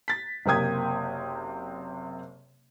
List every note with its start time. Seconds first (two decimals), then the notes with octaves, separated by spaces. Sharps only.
0.08 A6 B6
0.46 F#1 C3 A#3 G5 D#6 G#6